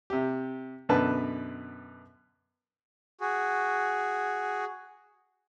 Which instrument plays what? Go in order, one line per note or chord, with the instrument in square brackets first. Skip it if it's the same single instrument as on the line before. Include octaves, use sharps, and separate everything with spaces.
[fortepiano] C3 G4
F#2 B2 D3 B4 A5
[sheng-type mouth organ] F#4 G#4